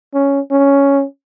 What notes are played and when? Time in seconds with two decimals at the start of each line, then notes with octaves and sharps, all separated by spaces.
0.14 C#4
0.51 C#4